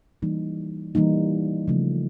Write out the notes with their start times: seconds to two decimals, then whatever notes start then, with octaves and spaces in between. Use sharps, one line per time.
0.22 E3 G3 A#3 D#4
0.95 E3 G3 A#3 D#4
1.68 C#3 F3 A3